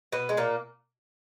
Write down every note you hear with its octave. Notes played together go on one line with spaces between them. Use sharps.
B2 B3
G#3
A#2 A#3